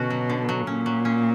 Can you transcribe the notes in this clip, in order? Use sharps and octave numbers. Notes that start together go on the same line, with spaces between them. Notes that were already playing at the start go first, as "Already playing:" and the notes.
Already playing: B2 D3 C#4 F#4
F#3
D3
F#3
A#2 C#4
F#3
C#4